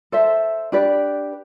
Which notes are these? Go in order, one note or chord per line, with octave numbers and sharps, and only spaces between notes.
A4 C5 E5
D4 G4 B4 D5